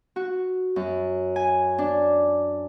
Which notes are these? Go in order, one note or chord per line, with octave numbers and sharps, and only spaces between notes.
F#4
F#2
G#5
D4